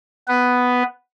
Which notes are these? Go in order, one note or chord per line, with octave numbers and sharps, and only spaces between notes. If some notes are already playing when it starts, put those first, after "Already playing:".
B3 B4